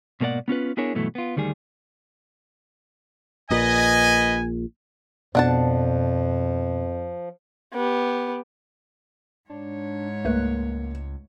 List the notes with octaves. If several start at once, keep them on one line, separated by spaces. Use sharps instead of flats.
G#2 B2 A#3 A4 D5 F#5
B3 C#4 F4 B4
B3 D4 E4 G#4 A#4 C#5
G2 B2 E3 F#3 A3
B3 F4
D2 D#3 G3 G#4
A#1 A#2 B4 D#5 G#5
F2 B2 F3 D4 F#5 A5
B3 G4
G#2 D4 C#5
C#2 A3 A#3 B4 F#6